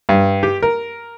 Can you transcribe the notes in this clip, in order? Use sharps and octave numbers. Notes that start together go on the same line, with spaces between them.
G2
G4
A#4